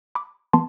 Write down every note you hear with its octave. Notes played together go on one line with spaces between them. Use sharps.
B5 D6
E3 B3 A5 C6